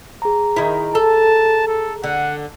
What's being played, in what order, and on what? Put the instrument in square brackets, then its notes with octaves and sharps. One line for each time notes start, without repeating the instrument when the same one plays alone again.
[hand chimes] G#4 A#5
[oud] D#3 E4
[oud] A4 [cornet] A5
[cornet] A4
[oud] D3 [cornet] F#5